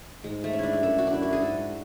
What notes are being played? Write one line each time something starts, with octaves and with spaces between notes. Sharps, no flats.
G#2 G#3
A3
C#4
D4 E4
E4
F#2 A4
F#4
D4
F#2 E4
F#4
G#4
G#2 A4